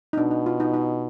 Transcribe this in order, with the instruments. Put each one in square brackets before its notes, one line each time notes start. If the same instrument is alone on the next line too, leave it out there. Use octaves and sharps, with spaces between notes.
[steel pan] D#4
[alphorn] B2 [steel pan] D4
[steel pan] D#4
F4
D#4
D#4